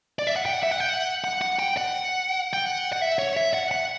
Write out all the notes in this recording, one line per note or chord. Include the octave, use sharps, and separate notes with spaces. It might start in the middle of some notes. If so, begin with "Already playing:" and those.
D5
E5
F#5
G5
F#5
E5
F#5
G5
F#5
F#5
F#5
G5
F#5
G5
F#5
F#5
E5
C#5
E5
F#5
F#5